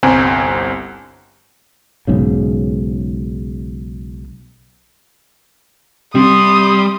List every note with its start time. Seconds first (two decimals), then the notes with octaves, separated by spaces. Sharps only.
0.03 G1 C2 C4 G#5 A#5
2.07 B1 G#2 C#3
6.15 C3 G3 C6 D#6